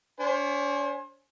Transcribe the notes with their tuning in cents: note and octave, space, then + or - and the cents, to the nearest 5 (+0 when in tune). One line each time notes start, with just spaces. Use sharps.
D4 -45 C5 +35 G#5 +0